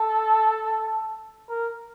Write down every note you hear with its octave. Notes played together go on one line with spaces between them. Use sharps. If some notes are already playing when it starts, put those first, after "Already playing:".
Already playing: A4
A#4